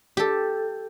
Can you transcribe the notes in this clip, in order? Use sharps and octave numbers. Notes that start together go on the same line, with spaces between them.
G4 A4